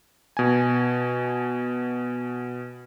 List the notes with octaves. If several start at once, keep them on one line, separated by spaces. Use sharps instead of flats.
B2 G#5